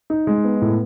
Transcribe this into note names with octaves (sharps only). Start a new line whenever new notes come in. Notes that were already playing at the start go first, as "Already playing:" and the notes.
D#4
G#3
B3
A2